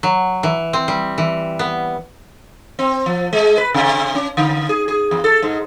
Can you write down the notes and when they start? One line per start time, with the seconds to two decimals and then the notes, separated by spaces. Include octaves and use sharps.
0.03 F#3
0.43 E3
0.73 C4
0.88 G3
1.18 E3
1.59 B3
2.79 C4
3.06 F3
3.33 G#3
3.57 B4
3.74 C3
4.15 C#4
4.37 D3
4.69 G#4
4.88 G#4
5.11 E2
5.24 A4
5.42 G#2